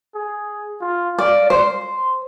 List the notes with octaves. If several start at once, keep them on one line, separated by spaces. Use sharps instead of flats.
G#4
F4
D5 F5
C5 C6